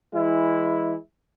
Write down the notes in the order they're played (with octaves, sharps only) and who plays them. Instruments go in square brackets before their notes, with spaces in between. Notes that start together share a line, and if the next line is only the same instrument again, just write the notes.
[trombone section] E3 G#3 E4